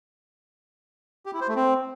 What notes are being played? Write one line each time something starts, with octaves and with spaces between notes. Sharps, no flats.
G4
E4
C5
A3
C4